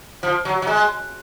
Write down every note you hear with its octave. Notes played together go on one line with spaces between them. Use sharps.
F3
F#3
F#3
G#3